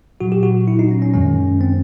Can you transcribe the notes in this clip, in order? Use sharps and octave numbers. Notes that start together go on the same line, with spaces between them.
A#2 F#3 F#4
G4
F#4
E4
D#4
C#4
C#4
F#2 D#3 G#3 C#4
C4